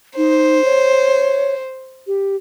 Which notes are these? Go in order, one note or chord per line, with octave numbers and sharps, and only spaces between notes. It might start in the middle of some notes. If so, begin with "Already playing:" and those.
D#4 C5
C#5
G4